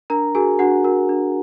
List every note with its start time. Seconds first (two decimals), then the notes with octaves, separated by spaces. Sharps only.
0.10 D4 A#4 A#5
0.35 F#4 G#4 A#4 G#5
0.59 D4 F#4 F#5
0.84 F#4 A#4
1.09 D4